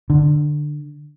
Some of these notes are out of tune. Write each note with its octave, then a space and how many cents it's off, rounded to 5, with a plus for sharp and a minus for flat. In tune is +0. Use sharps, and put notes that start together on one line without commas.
D3 +15